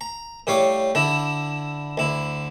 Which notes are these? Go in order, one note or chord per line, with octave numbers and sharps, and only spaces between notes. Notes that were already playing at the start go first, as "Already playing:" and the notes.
A#5
A2 G3 C#5 F5 D6
D3 D4 E4
D2 E4